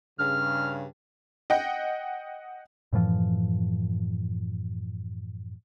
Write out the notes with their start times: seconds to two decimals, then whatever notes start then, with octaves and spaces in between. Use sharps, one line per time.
0.19 G2 C#3 F6
1.50 D#5 F#5 G5
2.93 F#2 A2 E3 F3